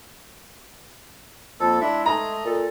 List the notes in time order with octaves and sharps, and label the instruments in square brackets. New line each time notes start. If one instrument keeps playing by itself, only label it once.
[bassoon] F2 [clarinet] A#3 [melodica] A4
[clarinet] G#3 [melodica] D4 E5 [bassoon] E4
[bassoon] A3 [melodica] D#5 [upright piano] A#5
[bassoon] A#2 [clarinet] A4